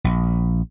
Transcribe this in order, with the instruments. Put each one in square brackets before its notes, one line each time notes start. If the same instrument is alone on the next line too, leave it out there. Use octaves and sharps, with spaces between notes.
[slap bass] A#1